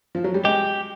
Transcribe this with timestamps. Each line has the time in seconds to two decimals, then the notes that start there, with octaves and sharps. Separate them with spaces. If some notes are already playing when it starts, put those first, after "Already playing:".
0.15 F3
0.24 F#3
0.34 G3
0.44 G#3 G4